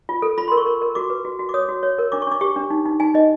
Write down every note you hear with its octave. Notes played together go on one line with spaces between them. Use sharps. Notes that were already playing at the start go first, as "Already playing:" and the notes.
F4
A4
F4 B5
C6
A#4
C#6
A#4
A#4
F#4 D6
B4
F#4
F#4
D6
C#5 D#6
F#4
C#5
A#4
D4 D6
C#6
D4 D6
G4 C#6
D4
D#4
D#4
D#4 G#5
D#4 D#5